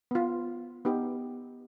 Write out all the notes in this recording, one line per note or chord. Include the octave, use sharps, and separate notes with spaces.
B3 F4
B3 D#4 G4